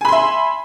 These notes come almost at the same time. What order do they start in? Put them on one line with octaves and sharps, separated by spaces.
G#5 B5 C6 E5